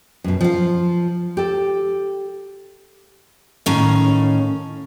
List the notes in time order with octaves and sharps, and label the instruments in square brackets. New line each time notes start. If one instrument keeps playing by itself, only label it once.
[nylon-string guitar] F#2 B2
F3 F5
G4 A4
[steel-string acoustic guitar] A2 D#3 C#4 F5